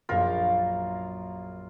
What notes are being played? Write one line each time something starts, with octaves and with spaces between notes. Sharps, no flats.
A#1 F#2 F4 A#4 G5